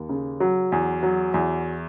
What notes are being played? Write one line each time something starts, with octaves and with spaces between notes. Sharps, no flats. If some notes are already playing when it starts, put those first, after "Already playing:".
Already playing: D#2
C#3
F#3
E2
F#3
E2